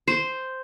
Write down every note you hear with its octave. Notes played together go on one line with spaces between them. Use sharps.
C5